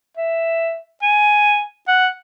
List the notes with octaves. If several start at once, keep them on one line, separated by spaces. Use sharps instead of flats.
E5
G#5
F#5